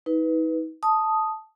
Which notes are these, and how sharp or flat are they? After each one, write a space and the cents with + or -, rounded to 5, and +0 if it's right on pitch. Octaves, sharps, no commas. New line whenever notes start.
D#4 +40 B4 +0
A5 -5 D#6 +0